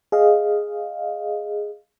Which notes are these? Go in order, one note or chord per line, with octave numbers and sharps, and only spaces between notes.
G#4 D#5 F5